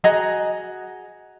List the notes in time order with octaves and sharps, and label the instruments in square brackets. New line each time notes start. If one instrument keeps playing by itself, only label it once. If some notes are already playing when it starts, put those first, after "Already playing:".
[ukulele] F#4 G#4 D#5 A#5